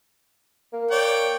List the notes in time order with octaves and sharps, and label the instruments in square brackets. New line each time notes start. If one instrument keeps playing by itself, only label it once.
[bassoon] A#3
[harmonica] C#5 D5 G5